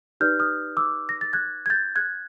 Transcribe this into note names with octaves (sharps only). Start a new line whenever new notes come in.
D#4 G4 B4 D5 F6 G6
D#6 F6
D6 E6
A#6
A6
F#6 G#6
G#6
G6 A6
F#6 G#6